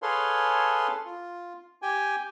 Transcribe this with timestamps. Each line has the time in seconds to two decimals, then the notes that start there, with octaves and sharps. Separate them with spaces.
0.02 G#4 A4 B4 C#5 F5 C6
1.06 F4
1.82 G4 G5 G#5